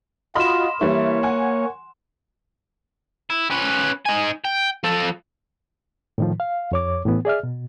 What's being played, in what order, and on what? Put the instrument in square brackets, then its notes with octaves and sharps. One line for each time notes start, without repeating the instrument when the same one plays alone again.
[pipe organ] F4 F#4 [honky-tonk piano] D#5 B5 F6 [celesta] C6 E7
[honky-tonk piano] E3 G3 E4 [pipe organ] A#3 C#5
[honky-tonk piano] F#5 G#5
[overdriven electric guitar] E4
C#4 B4
D#4 G#5
G5
F3 A4
[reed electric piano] A2 D#3 F3
F5
F2 C#5 D6
A2 E3 B3
G#4 D5 E5 F6
B2